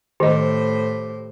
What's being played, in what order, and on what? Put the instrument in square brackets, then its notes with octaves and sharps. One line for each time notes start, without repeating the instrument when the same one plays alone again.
[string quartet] A2 C5 [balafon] D#3 D#5 [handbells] G4